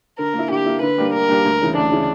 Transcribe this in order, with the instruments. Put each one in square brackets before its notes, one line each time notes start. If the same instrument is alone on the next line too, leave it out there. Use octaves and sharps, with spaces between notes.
[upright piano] D3 [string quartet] A#4
[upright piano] A#3
E4
[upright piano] D3 [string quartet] G4
[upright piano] A#3 E4
[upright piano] D3 [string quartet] B4
[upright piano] G3 A#3 D4 G4
[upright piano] D3 [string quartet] A#4
[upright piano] G3 A#3 D4 G4
D2
C#3 E3
[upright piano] D2 [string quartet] D4
[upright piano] C#3 E3